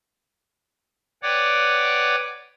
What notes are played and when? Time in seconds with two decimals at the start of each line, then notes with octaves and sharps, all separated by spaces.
1.23 B4 C#5 D5 F#5 G5 D6